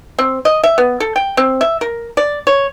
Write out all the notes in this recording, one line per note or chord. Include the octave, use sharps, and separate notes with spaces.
C4
D#5
E5
B3
A4
G5
C4
E5
A#4
D5
C#5